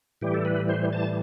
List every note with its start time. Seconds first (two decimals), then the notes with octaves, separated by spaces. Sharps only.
0.21 A2 E3 G3 G4
0.34 A4
0.45 B4
0.69 C5
0.93 A5